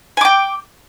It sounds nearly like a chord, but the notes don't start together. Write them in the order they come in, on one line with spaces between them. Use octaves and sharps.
G#5 D6 G5